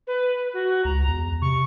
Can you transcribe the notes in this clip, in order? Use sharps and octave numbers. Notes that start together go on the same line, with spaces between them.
B4
F#4
C#2 A#5
E2
C3 C#6